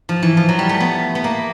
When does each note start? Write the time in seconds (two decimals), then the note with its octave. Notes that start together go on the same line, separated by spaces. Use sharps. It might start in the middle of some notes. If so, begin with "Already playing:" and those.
0.09 F3
0.23 E3
0.37 F3
0.49 F#3
0.59 G3
0.69 A3
0.80 B3
1.15 B3
1.24 A#3